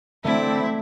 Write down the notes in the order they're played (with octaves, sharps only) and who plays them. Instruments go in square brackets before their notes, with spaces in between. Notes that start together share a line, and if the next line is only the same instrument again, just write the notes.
[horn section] D3 D5 E5 [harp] A3 [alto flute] C4 [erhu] E4